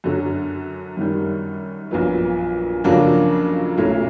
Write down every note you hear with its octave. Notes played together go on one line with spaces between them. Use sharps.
F#2 D3 F#3
F#2 D#3 G3
A#1 A#2 F#3 B3
F2 C#3 F#3 A#3 D4
B1 A#2 F#3 A3 C#4